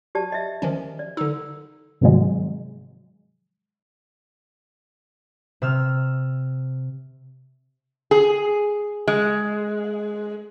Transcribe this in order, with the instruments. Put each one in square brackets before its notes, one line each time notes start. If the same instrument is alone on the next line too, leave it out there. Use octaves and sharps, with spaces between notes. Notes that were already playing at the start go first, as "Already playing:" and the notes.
[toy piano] G4 D5 A5
D#5 E5
[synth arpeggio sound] D#3 F3 C#4
[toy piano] D5
[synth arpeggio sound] D3 D#4 [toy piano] E6
[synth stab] G#2 C3 D#3 F3 F#3 G#3
[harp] C3 E6 F6
[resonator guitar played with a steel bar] G#4
G#3